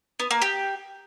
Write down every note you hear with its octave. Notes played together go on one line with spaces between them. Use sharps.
B3
A#3
G4